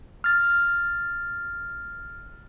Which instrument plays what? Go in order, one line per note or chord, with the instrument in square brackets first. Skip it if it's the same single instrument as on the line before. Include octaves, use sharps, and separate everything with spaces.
[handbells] F6 A6